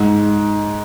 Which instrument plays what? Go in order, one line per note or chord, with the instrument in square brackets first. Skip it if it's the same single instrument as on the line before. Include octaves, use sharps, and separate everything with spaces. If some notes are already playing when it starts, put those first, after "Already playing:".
Already playing: [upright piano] G#2